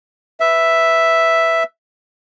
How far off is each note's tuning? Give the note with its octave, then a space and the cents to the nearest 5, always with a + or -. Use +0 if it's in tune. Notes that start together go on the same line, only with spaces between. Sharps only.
B4 +0 E5 +0